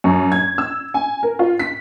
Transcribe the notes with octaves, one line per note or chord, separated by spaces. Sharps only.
F#2
G#6
E6
G#5
A#4
F4
B6